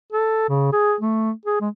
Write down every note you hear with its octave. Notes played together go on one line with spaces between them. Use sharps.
A4
C#3
G#4
A3
G#4
G#3